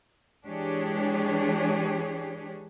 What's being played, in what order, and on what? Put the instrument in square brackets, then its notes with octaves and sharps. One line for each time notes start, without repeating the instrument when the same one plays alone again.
[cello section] E3 G#3 D4 G4 G#4 C#5